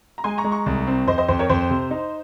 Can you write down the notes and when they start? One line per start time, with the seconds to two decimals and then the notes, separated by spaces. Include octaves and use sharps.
0.18 A#5
0.24 G#3 G#5 C6
0.38 A#5 C#6
0.44 G#3
0.51 A#5 C#6
0.66 C2
0.87 C4
1.07 F2 C5 D#5
1.18 C5 D#5
1.28 F2 C5
1.39 A#4 C#5
1.50 F2 C5
1.70 C3
1.91 D#4